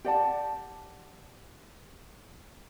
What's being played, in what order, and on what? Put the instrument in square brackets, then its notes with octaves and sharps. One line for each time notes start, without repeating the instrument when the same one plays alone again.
[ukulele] G4 D5 F#5 A5